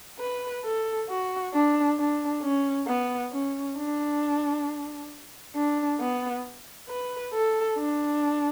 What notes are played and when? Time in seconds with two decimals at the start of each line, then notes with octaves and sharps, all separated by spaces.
0.19 B4
0.64 A4
1.09 F#4
1.53 D4
1.98 D4
2.42 C#4
2.87 B3
3.32 C#4
3.76 D4
5.55 D4
6.00 B3
6.89 B4
7.33 A4
7.77 D4